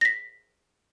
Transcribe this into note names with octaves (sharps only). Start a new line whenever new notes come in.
A#6 B6